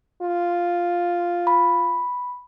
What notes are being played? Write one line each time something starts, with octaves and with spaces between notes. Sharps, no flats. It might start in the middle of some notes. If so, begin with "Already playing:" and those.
F4
B5